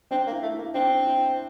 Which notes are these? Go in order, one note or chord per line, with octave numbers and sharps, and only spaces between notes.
C4 D4
A#3
E4
A3
E4
A#3
C4 D4
E4